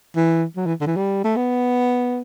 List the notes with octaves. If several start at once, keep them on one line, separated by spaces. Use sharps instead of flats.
E3
F#3
E3
D3
E3
G3
A3
B3